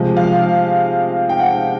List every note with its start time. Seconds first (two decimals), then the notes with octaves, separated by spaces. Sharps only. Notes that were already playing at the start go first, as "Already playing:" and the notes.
Already playing: C3 F3 G#3
0.17 F5
1.29 G5
1.40 F#5